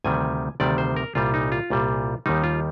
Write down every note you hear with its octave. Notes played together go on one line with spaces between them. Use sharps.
D2 C3 D#3 G3 G#5
D2 C3 D#3 G3 D5
C5
A#4
C2 A#2 G3 F4
D#4
F4
C2 A#2 G3
D#2 D#3 G3 D#4
F4